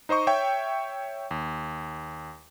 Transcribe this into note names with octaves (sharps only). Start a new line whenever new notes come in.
D#4 C5 D#5 C#6
C#5 E5 G5 C#6
D#2